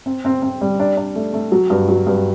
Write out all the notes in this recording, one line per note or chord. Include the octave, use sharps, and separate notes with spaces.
C4
C4
C4
G3
D4
D4
A3
A3
F#3
G2
F#3
G2